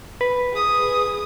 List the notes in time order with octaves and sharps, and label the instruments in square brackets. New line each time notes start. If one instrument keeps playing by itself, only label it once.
[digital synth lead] B4
[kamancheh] G#4 D#6